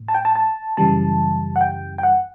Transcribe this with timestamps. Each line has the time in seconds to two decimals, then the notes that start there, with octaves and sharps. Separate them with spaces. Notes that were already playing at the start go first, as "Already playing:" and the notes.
Already playing: A2
0.08 A5
0.14 G5
0.25 A5
0.35 A5
0.77 F#2 C#3 E3 G3 A5
1.56 F#5
1.61 G5
1.98 G5
2.03 F#5